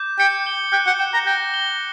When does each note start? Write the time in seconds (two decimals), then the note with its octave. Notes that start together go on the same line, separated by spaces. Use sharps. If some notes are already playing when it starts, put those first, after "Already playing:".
Already playing: D6 G6
0.19 G5 C#7
0.46 G7
0.72 G5 F#6
0.87 F#5
0.99 G5 E7
1.13 A#5
1.26 G5 A#6
1.54 G7